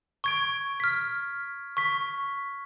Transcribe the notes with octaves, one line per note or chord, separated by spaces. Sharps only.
C#6 G#6 D7
F6 B6
C#6 B6